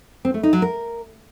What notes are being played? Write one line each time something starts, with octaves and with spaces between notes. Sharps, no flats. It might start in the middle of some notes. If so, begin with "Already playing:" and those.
C4
A3
D#4
F#3
A#4